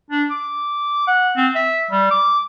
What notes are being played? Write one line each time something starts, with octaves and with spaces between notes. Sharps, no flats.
D4
D6
F#5
C4
E5
G3
D6